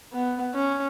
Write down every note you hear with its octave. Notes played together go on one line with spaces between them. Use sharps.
B3
C#4